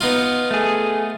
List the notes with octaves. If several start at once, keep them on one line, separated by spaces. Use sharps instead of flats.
B3 D#4 F4
A3 G#4